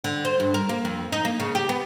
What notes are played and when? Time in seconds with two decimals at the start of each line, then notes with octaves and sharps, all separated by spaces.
0.04 D3
0.25 C5
0.40 G2
0.54 A#4
0.69 A#3
0.85 F2
1.12 D#4
1.25 A#3
1.40 C#3
1.55 G4
1.69 B3